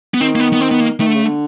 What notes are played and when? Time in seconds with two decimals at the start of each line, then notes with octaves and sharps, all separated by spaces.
0.14 B3
0.21 D#3 C4
0.35 A#3
0.40 B3
0.53 B3
0.61 C4
0.71 B3
0.80 A#3
1.00 D#3 A3
1.07 D3
1.16 C#3
1.24 D3